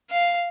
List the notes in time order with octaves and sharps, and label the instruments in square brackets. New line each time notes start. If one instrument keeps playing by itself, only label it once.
[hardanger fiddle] F5